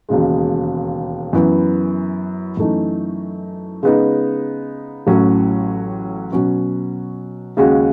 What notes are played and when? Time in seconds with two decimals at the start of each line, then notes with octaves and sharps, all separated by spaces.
0.09 E1 D#2 C#3 G#3
1.33 F#2 E3 B3
2.57 F#2 E3 A3 D#4
3.83 C#3 G#3 B3 D#4
5.07 A1 A2 F#3 C#4 F#4
6.32 B2 F#3 C#4 F#4
7.57 D#2 C#3 G#3 C#4 F#4